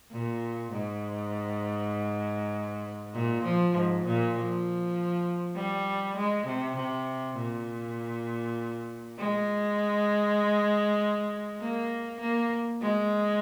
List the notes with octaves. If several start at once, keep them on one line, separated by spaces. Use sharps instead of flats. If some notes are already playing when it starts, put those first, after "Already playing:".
A#2
G#2
A#2
F3
G#2
A#2
F3
G3
G#3
C3
C3
A#2
G#3
A#3
A#3
G#3